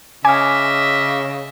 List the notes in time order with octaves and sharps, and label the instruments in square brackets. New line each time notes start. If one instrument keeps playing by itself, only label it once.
[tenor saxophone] C#3 [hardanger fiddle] D#5 E5 [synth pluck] G#5 [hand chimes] D6 F6